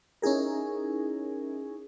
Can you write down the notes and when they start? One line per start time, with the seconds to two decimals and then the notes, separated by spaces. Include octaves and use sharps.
0.22 C#4 D#4 E4 G#4 A#4